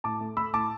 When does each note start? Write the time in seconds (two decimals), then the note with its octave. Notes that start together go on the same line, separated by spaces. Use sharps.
0.04 A2 A5 D6
0.21 A3
0.37 A3 B5 E6
0.54 A2 A5 D6